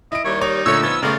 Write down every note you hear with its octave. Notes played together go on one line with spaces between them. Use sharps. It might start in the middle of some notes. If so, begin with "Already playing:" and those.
E4 D#5 D7
D#2 G3 C#5
D#4 C#5
A#2 D3 A3 C#5 E6
F3 B3 D#4 C#5 A6
C#3 A3 B3 F4 A#4 D5